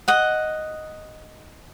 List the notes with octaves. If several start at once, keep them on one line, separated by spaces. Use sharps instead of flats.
D#5 F#5